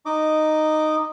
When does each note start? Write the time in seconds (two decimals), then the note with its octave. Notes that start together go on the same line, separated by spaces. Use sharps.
0.06 D#4 D#5 D6